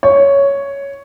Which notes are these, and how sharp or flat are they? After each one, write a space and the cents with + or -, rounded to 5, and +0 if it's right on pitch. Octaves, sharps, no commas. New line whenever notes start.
C#5 +5